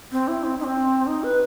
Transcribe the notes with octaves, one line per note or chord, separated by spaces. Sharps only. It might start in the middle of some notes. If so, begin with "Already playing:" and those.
C4
E4
C4
D#4
C4
D#4
B4